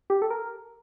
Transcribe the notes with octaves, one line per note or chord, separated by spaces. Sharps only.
G4
A4
A#4